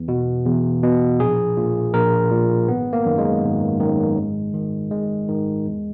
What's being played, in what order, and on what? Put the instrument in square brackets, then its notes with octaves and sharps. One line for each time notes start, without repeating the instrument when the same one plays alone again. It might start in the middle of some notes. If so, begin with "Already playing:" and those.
Already playing: [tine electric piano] E2
B2
E2
B2
A#1 G#4
A#2
A#1 A#4
A#2
G#1 B3
A#3
F#2 D#3
G#3
G#1
F#2 D#3
G#1
G#2 D#3
G#1 G#3
G#2 D#3
E2